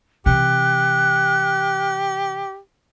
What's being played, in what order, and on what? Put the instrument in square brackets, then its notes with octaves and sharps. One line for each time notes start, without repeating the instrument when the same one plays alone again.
[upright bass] C3 E3 [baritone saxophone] G4 [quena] F#6